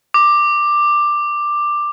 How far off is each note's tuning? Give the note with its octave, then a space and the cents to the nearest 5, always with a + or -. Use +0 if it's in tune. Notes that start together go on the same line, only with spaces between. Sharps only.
D6 +10